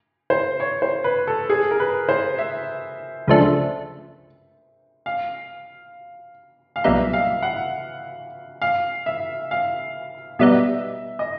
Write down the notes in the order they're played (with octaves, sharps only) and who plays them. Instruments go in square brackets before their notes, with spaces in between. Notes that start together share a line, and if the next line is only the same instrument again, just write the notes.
[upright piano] C5
C#5
C5
B4
A4
G#4
A#4
B4
C5
E5
[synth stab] C#2 C#3 F3 A3 D4
[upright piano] F5
F5
[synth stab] B1 A#2 G3 B3 D#4 [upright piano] E5
[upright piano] F5
F#5
F5
E5
F5
[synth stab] B2 G3 B3 D#4 [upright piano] E5
[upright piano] D#5